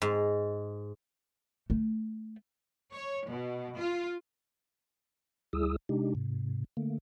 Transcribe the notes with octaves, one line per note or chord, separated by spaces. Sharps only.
G#2
A3
C#5
B2
F4
D2 G3 E4 G#4 D#6 E6
C3 G#3 D4 D#4 G4
G#2 C3
D3 A3 A#3